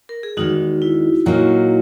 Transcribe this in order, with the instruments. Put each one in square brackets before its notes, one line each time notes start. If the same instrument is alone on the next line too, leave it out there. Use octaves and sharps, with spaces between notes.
[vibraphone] A#4
G#4
[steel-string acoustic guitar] E2 D#3 G#3 [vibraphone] D#4 F#4
[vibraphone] E4
[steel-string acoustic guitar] A#2 F#3 A#3 D#4 F#4